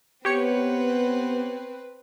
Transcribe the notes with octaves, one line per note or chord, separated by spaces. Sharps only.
B3 C4 G4 B4 C#5 C#7